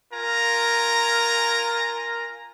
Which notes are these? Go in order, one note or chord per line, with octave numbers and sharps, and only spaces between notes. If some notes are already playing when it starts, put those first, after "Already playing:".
F4 A#4 G#5 A#5